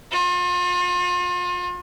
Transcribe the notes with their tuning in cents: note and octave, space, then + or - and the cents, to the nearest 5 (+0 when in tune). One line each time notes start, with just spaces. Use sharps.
F4 +40